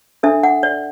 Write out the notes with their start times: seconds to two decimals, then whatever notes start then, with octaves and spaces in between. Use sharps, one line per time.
0.23 D4 A4 E5
0.43 F#5
0.63 D5